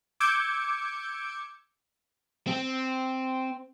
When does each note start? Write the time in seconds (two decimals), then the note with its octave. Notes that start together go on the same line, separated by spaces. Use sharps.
0.20 D6 E6 G6 G#6 C#7 D7
2.47 C4